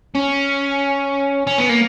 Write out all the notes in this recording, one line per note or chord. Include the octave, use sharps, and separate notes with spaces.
C#4
C#4
B3
A#3